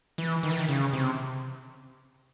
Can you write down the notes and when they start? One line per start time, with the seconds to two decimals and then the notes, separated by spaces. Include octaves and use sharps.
0.18 E3
0.43 D#3
0.51 E3
0.59 D#3
0.69 C#3
0.93 C3